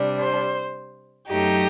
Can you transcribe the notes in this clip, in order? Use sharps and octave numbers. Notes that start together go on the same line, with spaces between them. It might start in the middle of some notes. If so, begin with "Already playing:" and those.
Already playing: C3 G3 D4
C5
F#2 F#3 A3 D#4 G4